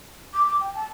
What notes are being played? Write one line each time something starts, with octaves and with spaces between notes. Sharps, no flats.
D6
D6
G5
A5